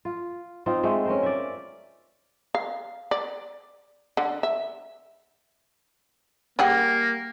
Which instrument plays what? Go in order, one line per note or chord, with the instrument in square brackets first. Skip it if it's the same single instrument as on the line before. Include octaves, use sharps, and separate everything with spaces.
[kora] F4
C4 D#4 F4
G#3 A3 C5
C#4 A#4 C5
D5 E5
[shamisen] F5
D5
D3
E5
[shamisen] G3 G#4 F#5 [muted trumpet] A#3 [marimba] G5